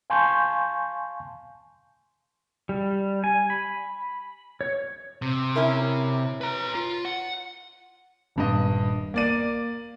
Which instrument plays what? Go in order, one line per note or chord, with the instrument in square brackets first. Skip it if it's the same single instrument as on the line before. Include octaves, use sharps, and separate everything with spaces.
[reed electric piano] F5 G#5 A5 C6 C#6 G6
[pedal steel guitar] G3
G#5
B5
C#5
[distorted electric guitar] C3
[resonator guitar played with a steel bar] C#4 E4 A#4
[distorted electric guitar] B4 A#5
F4
F#5
[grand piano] D#1 G2 D#5
A#3 D5 D#7